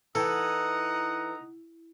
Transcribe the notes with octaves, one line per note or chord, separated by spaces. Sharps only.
E3 D#4 A4 F#5 A#5 D#6